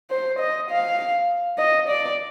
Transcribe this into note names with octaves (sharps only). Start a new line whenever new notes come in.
C5
D#5
F5
D#5
D5